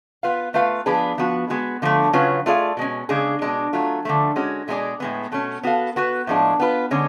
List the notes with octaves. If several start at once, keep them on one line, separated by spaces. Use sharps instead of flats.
B3 F4 B4 F5
A3 F4 B4 F5
F3 B3 D4 G#4 B4
F3 B3 F#4
G#3 B3 F#4
D3 F3 A3
C#3 F#3 C#4 F4 B4
A3 F4 G#4 D5 F5
B2 G#3 C#4
C#3 G#3 D4 G#4
B2 G#3 D4
F#3 A3 F4
D3 F3 A3
G#3 C#4 F#4
B2 G#3 D4 G#4 D5
A2 G#3 B3
B2 A3 C#4
B3 F#4 A4 F5
B3 F#4 B4
A2 F3 G#3 D4
B3 F4 B4
D3 G#3 C#4